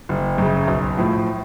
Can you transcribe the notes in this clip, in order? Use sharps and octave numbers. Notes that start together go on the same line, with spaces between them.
F#1
F#2 C#3
B1
A2 F3